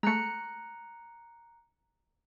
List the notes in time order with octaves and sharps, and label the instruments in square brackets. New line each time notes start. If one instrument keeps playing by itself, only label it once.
[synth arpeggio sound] G#3 A3 [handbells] A#5 F#6 C#7